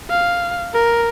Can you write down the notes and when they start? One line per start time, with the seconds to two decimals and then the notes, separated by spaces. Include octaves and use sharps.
0.11 F5
0.74 A#4